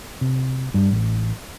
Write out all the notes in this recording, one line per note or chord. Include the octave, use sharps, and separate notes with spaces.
C3
G2
A1